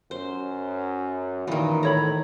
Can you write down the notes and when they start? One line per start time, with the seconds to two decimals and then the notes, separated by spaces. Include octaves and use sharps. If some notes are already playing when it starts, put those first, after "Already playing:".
0.11 F#2 C5
1.47 A#2 D#3 E3
1.83 A2 A4 C#5 A#5 B5